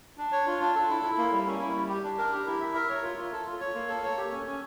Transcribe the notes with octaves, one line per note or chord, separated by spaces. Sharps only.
D4
C#5
F4
D4
A4
E4
E4
A#3
G3
C#4
E4
G3
G4
D4
A#4
G4
E4
E5
A#4
C#5
F4
F4
A4
F4
C#5
A#3
A4
C#5
G4
C#4
C#4